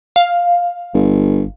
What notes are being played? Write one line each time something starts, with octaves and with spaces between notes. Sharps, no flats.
F5
G1